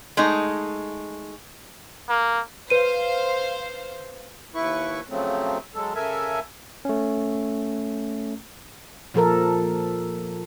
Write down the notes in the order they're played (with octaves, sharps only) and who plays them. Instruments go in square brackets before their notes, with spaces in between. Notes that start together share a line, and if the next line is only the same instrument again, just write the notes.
[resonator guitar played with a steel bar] G#3 A3 D#4
[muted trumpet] A#3
[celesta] B4 D#7 [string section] C5 F5
[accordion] D#2 E4 B4 C#6
C#3 F3 F#3 A3 C4
F#3 G#3 A4
C#3 A4 A#4 E5 G#5
[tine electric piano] A3 C#4
[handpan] A#2 F3 A4 A#4